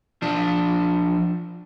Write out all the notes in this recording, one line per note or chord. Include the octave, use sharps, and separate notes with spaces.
F3 D4